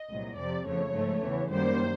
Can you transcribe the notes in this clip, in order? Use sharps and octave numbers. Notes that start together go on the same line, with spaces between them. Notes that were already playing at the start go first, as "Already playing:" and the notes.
Already playing: D#5
C2 A#2 F#3
F2 C3 F3 D5
F2 C#3 F3 A3 C#5
G#2 F3 A3
E2 C#3 E3
F#2 D#3 G3 A#3 C5